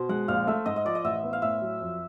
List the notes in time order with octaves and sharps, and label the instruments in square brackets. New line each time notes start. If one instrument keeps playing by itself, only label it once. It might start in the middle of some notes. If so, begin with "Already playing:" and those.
Already playing: [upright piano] B2 [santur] C5
[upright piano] G#3 [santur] F#5
[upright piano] A#1 [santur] F5
[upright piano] A3 [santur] E5
[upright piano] G#2 [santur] D#5
[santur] D#5
[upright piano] F3 [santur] D5
[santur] D#5
[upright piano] A1 [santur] E5
[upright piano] B3
[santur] F5
[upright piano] A2 [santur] E5
[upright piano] F#3
F2